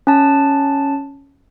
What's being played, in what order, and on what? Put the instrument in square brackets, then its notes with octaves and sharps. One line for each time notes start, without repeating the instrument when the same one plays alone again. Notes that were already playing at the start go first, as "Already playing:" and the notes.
[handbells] C#4 A5